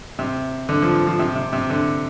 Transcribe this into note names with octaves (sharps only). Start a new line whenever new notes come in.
C3
D3
F3
F3
F3
C3
C3
C3
D3